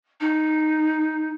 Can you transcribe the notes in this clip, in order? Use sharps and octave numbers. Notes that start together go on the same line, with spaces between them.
D#4